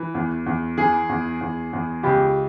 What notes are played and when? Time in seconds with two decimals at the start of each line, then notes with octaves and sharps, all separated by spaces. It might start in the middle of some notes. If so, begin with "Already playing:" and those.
Already playing: E3
0.14 E2
0.46 E2
0.78 E3 G#4
1.09 E2
1.41 E2
1.73 E2
2.03 C#2 G4